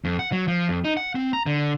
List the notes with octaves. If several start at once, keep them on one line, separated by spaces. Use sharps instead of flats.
F2
F#5
F#3
F3
F2
D#4
F#5
C4
A#5
D3